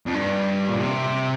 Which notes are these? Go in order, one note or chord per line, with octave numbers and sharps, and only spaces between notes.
F2
G2
A#2
C3